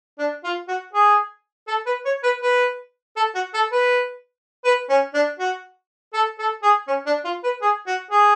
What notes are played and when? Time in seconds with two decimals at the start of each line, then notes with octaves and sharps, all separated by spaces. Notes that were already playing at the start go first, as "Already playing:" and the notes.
0.19 D4
0.44 F4
0.68 F#4
0.93 G#4
1.68 A4
1.86 B4
2.05 C#5
2.23 B4
2.42 B4
3.16 A4
3.35 F#4
3.54 A4
3.72 B4
4.65 B4
4.89 C#4
5.14 D4
5.39 F#4
6.13 A4
6.39 A4
6.63 G#4
6.87 C#4
7.06 D4
7.25 F4
7.44 B4
7.62 G#4
7.87 F#4
8.11 G#4